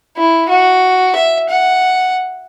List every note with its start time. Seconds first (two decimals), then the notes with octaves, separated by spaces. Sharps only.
0.17 E4
0.49 F#4
1.16 E5
1.49 F#5